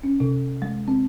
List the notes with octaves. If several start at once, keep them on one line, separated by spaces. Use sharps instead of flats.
C#4
C3
G#3
C4